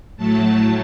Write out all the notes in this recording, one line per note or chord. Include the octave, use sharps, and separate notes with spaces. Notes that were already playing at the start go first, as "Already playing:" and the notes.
A2 F#3 A3 A5